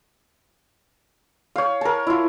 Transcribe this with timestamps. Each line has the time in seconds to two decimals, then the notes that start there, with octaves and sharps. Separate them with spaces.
1.56 C#5 F5
1.81 A#4 A5
2.07 E4 F4